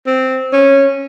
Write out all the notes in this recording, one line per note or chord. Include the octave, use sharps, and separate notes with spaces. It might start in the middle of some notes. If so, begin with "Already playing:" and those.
C4
C#4